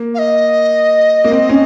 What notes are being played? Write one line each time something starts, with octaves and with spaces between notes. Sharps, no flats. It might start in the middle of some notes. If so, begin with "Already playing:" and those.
Already playing: A#3
F5
D#5
A#3
C4
C#4